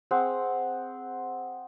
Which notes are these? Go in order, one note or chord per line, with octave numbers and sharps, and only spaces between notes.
C4 G#4 F#5